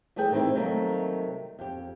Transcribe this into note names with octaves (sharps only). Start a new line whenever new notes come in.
E3 G3 A3 G#4 G5
D#3 E3 G3 C4 D#4 E4
C3 D#3 F#3 G3 A3 A#3
F2 G4